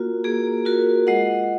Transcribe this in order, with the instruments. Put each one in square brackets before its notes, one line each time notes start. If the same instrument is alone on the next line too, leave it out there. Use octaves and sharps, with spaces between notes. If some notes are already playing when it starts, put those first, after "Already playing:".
Already playing: [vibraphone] A#3 F4 F#4 A#4
A#3 G#4
F4 F#4 A#4
G#3 D#5 F#5